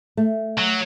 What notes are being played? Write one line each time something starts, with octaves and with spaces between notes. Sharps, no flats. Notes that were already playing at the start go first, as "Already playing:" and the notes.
A3
F#3